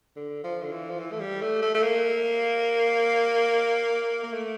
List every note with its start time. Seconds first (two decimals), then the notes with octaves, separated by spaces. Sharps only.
0.16 D3
0.44 F3
0.63 D3
0.71 E3
0.89 F3
0.99 E3
1.12 A3
1.20 G3
1.41 A3
1.62 A3
1.75 A3
1.83 A#3
4.23 A#3
4.33 A3